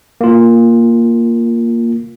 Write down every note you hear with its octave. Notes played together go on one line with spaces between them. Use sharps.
A#3 F4